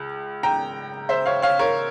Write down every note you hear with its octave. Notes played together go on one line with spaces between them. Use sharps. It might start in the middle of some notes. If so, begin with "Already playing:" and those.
Already playing: C#2
G5 A#5
C5 E5
C#5 F5
C#5 F5
A#4 C#5